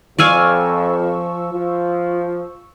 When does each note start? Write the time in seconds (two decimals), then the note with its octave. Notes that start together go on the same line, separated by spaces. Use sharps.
0.19 F2 F3 D5 F5 G#5 C#6 E6
1.53 F3 F4